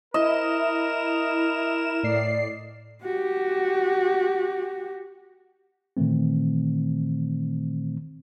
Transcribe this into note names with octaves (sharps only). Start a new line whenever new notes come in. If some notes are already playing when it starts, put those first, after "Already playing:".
E4 A#4 D#5 E7
A2 D5 C7
F#4 G4
A#2 D#3 E3 A3 C4